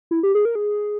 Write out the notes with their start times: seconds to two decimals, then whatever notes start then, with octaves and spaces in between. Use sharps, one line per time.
0.11 E4
0.23 G4
0.35 G#4
0.45 A#4
0.55 G#4